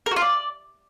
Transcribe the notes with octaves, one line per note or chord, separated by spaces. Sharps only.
A#4
F#4
F4
D5